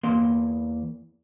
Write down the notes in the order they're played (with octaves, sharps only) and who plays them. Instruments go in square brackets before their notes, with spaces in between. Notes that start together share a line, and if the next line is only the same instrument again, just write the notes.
[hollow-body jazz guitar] E2 A#3 C6